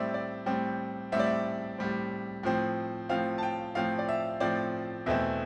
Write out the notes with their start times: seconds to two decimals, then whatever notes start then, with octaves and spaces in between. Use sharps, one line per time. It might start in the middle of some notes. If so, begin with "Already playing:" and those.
Already playing: A2 G3 C4 D5 E5
0.14 D5
0.46 A2 G3 C4
1.12 A2 G3 C4 E5
1.19 D5
1.26 E5
1.78 A2 G3 C4
2.43 A2 F3 C4
3.09 A2 F3 C4 F5
3.38 A5
3.43 G5
3.75 A2 F3 C4 F5
3.99 D5
4.09 E5
4.40 A2 F3 C4 D5
5.06 E2 B2 A3 C4 E5